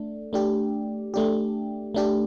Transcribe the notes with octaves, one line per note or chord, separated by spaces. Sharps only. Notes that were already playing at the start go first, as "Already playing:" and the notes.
Already playing: A3 D4
A3 D4 G4
A3 D4 G4
A3 D4 G4